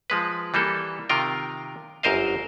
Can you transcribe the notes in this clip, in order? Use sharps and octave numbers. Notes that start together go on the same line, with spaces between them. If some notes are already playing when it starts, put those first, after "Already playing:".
F3 G#3 B4
E3 G3 A#3 A4
C3 D#3 F4 A#4 G5
G1 F#2 A#4 C5 D#5 F5